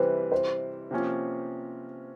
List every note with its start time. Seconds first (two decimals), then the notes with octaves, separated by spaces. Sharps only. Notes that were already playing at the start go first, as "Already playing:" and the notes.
Already playing: C3 E3 G3 B4 C5
0.32 C5
0.91 C3 F3 A#3 C#4 F4